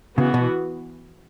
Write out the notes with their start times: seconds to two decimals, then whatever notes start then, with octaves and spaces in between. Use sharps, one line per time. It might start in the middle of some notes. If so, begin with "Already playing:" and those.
0.17 C#3 E3 B3 F#4
0.34 B2